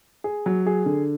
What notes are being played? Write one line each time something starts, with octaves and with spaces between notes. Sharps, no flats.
G#4
F#3
G#4
D3